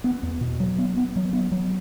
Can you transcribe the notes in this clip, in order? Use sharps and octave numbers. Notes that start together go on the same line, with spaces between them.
B3
E2
B2
F#3
B3
B3
F#3
B3
F#3